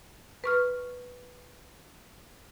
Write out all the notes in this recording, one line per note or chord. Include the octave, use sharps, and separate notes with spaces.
B4 C#6 F6